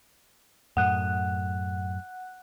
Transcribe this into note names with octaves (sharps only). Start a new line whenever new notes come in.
F#2 A2 F#5 F#6